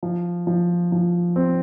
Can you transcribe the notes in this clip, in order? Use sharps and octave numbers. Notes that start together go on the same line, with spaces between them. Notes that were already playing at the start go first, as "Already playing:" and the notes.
F3
F3
F3
C4